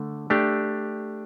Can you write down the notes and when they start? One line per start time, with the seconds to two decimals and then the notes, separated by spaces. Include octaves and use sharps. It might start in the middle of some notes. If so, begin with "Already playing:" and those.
Already playing: D3 A3
0.30 A3 D4 G4